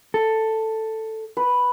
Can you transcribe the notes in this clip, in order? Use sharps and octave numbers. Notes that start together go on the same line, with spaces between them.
A4
B4